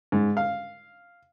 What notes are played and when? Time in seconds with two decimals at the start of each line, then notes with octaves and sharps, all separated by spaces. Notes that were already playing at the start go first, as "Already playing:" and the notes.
0.12 G#2
0.37 F5